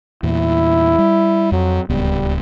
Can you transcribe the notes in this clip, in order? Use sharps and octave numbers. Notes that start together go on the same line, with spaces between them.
E2 A#2 E4
G3
F2 F#3
D1 C#2 G3 B3